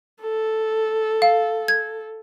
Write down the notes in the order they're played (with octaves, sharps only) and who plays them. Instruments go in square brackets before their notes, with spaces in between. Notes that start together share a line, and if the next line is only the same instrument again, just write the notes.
[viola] A4
[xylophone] F5
G#6